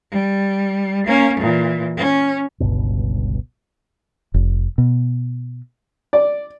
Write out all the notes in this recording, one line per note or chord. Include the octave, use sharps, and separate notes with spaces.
G3
A#3 C#4
A#2 E3
C#4
G1 C#2 G2 B2
F1
B2
D5